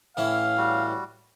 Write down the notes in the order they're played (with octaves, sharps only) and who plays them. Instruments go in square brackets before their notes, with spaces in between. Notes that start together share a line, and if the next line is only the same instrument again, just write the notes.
[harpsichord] A2 E3 C#4 [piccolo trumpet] F5
[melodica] G3 F#4